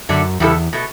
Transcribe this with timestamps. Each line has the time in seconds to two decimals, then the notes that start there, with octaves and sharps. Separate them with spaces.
0.09 F#2 D3 A3 D4
0.40 E2 C#3 G3 B3 E4 A4
0.73 B2 A3